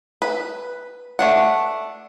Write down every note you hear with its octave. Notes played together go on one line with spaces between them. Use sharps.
B4
A3 D4 F#5